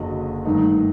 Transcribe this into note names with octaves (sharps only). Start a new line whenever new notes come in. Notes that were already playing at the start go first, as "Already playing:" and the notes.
Already playing: F#1 F#2 D3 F#3 D#5
G2 D#3 A3 D#4